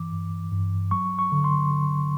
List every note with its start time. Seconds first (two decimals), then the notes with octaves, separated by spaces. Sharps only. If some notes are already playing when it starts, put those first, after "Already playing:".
Already playing: G2 E3 D6
0.12 G2
0.52 G2
0.91 F#3 C#6
1.19 C#6
1.32 D3
1.44 C6
1.71 D3